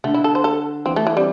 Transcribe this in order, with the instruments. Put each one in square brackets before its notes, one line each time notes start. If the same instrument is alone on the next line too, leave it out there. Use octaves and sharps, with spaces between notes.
[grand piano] D3 [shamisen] A3
[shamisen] E4
A4
C5
A4
[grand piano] E3 [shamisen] C4
[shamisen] A3
E3
[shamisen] G3 [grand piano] C4